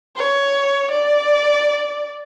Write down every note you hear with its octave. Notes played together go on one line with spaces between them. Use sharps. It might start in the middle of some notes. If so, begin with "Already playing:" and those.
C#5
D5